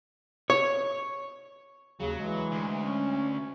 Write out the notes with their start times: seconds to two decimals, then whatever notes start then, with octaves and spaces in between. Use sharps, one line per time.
0.50 C#5
2.00 D#2 C#3 F#3
2.19 E3 G#3
2.52 D2
2.81 C#4